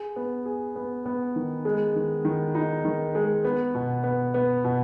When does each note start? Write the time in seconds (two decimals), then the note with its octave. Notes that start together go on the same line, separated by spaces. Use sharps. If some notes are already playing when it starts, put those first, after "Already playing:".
Already playing: G#4
0.16 B3
0.45 G#4
0.76 B3
1.06 B3
1.36 D#3
1.65 G#3
1.96 D#3
2.25 D#3
2.55 D#4
2.85 D#3
3.15 G#3
3.44 B3
3.74 B2
4.04 B3
4.34 B3
4.64 B2